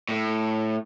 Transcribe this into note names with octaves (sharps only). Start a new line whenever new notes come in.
A2